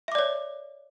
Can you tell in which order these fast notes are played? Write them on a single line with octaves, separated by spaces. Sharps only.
E5 D6 D5 C#5